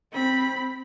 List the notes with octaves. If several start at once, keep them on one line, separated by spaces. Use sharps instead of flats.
C4 B5